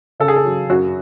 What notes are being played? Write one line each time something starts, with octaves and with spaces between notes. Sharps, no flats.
C#3 A4
G#4
A4
F#3
F#2 F#4